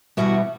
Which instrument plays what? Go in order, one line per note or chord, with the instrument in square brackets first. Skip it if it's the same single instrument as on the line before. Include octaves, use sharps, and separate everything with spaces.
[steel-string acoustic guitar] E2 B2 G3 B3 E4 F#4